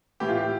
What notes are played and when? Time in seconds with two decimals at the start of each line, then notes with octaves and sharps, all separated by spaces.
0.20 A2 E3 G4
0.29 F4
0.37 G4